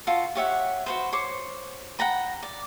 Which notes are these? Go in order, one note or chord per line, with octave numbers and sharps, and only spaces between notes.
F4 F#4 A4
G4 C#5 E5 F#5
F#4 B4 C5
C5 C#5 C#6 D6
F#5 G5 A#5 B5
D5